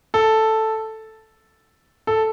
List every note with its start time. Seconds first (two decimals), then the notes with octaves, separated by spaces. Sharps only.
0.14 A4
2.07 A4